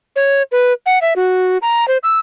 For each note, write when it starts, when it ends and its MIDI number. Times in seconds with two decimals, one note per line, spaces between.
0.16 0.42 73
0.52 0.73 71
0.86 0.99 78
1.02 1.14 76
1.16 1.58 66
1.62 1.87 82
1.88 1.98 72
2.03 2.19 88